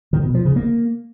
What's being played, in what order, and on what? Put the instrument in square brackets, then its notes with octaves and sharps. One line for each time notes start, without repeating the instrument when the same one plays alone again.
[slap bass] D#3
B2
F3
C#3
A#3